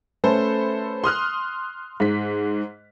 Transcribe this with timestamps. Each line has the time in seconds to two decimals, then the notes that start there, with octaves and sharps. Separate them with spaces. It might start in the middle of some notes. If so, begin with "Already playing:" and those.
0.24 A3 C#4 A4 B4 C5
1.04 C6 D#6 F6 F#6
2.00 G#2 B6